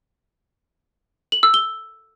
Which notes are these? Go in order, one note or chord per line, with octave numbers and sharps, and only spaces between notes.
F#7
E6
G7